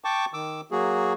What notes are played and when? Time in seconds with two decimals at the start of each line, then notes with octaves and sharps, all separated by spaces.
0.04 G5 A5 C#6 D6
0.34 D#3 D6 E6
0.71 F#3 A#3 F#4 G#4